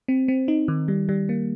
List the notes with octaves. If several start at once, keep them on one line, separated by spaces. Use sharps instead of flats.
C4
C4
D#4
D#3
G3
G3
A#3